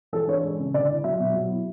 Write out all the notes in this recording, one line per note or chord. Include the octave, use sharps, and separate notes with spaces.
E3 A4
D4 C#5
G#3
C#3
D3 D5
E4
F#3 E5
B2
F#3
E4